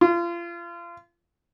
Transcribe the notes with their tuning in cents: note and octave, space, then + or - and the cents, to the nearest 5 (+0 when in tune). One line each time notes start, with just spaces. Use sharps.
F4 -30